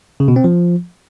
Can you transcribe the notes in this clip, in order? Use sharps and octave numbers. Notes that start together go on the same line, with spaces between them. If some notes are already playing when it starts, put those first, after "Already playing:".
C#3
B2
C4
F3